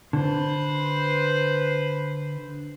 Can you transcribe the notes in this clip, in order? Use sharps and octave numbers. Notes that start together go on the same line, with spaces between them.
D3 B4 C5